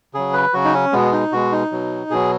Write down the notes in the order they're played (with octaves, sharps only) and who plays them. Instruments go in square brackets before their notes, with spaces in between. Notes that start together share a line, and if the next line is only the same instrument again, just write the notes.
[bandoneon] C#3 F#3 G#4
B4
C#3 F#3 F#4
D#4
C#4
B2 G#3 B3
D#4
B2 G#3 F#4
D#4
B2 F#3
B2 F#3 G#4